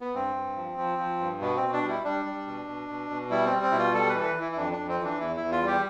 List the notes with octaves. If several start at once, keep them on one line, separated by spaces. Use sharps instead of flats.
B3
G2 C4
G2
F3
F3
F3
G2
B2 B3
C4
B2
D4
G3
E4
G3 D4
G3
B2
B2
B2
B2
G3 E4
C4
G3
C4
B2 E4
F4
G3 A4
B4
E3
A4
B4
E3
E4
E4
F2 D4
D4
F2
C4
E3
D4
E2 E4
E2 E4
F4
G3
G4